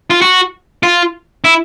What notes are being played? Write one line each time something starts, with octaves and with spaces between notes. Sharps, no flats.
F4
F#4
F4
E4